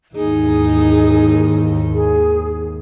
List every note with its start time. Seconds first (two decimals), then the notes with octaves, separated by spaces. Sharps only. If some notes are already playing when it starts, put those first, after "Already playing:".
0.15 D#2 G#2 E3 D#4 G#4
1.95 G#4